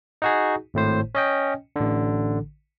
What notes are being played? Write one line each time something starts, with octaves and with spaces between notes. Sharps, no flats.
D#4 F#4 G#4
G#1 A2 C5
C#4 D#5 G5
A1 D3